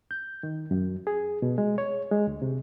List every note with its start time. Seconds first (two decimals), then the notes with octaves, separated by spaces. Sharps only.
0.11 G6
0.43 D#3
0.71 F#2
1.07 G#4
1.42 B2
1.58 G#3
1.78 C#5
2.11 G#3
2.27 D2
2.42 C3